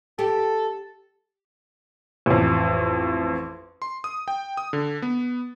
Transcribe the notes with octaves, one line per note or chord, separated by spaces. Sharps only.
G4 A4
A1 F2
C6
D#6
G5
D#6
D3
B3